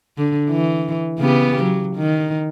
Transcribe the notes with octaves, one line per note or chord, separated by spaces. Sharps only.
D3
E3
C#3 B3 G4
F#3
D#3